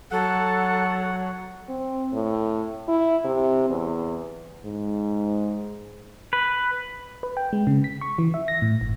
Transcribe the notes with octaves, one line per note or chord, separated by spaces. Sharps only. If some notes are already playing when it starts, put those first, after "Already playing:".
F#3 A4 F#5
C4
A2
E4
C3
E2
G#2
B4
B4
G5
G#3
C#3
B6
C#6
E3
E5
A#6
A2
G1